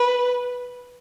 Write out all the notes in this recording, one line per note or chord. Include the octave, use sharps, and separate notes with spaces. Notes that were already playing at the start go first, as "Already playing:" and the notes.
Already playing: B4